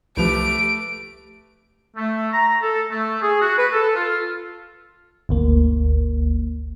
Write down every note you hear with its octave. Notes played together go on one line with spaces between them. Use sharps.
C2 F3 A3 G4 B4 D7 F7
A3
A#5
A4
A3
G#4
F#4
B4
A4
F4
G1 D2 A#3